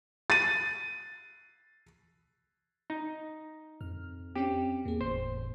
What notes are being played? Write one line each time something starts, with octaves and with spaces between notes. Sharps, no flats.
A6 D#7
D#4
F2 F6
C4 C#4 G4
E2 A#3 G#4
F#1 E2 A2 C5